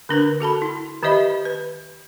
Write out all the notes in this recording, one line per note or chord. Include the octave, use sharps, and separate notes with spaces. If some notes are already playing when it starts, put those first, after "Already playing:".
D3 D4 A#4 B4
F#4 A4 A5 B5
E4
D#3 G4 C5 D#5 E5 B5
B4